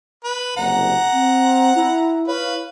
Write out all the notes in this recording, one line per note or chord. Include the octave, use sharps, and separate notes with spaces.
B4
F#1 C2 F#5 A#5
C4
E4
E4 B4 C#5 F5